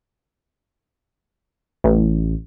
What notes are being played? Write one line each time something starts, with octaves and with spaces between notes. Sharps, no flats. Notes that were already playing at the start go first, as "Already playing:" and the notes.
A1